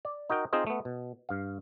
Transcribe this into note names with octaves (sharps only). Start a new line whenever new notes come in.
D5
D#4 F#4 A#4 G5
C4 D#4 F4 G#4 C5 D#5
A3 B3
B2
G2 F5